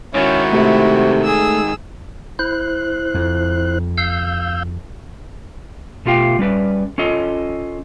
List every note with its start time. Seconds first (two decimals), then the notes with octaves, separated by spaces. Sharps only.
0.14 G#2 D#3 C#4 E4 F#4
0.53 C3 A3
1.23 G#4 E6
2.39 E4 C5 F#6
3.14 F2
3.98 F5 E6 G6
6.05 B2 A3 F4 G4 F5 G5
6.39 G3 C#4 B4 D5
6.98 C#4 F4 A4 D#5